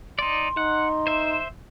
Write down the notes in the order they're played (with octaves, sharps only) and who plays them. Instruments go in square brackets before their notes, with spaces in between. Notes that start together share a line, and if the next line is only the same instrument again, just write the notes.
[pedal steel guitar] D#4 D5 [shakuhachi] C6
[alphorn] D#4 [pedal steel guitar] F#5
[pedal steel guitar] C5 E5